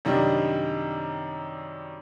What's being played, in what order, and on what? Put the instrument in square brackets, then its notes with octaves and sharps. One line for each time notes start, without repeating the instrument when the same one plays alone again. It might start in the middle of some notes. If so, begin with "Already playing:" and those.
[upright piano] F#2 C3 D#3 G3 D4 D#4